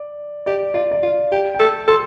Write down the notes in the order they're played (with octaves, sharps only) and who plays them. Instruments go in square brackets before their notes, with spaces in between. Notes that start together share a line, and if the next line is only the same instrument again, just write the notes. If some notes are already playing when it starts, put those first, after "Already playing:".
Already playing: [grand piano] D5
[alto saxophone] G4 [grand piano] D5
[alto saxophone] F4 [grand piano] D5
[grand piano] D5
[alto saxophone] F4 [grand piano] F5
[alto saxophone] G4 [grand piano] G5
[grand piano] G5
[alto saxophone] A4 [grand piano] A5
[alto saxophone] A4 [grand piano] C6